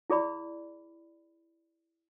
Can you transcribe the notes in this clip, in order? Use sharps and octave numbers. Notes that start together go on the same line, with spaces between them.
E4 G#4 D5 B5